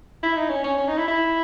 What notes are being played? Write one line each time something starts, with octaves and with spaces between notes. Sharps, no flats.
E4
D#4
C#4
C#4
C#4
D#4
E4
E4